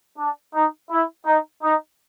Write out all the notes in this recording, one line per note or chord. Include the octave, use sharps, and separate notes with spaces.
D4
D#4
E4
D#4
D#4